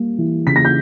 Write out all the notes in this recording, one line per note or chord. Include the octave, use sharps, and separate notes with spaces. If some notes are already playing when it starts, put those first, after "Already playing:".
Already playing: G3 A#3
E3
C#3 B6
A#6
G6